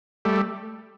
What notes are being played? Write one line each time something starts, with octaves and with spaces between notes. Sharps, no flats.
G3 A3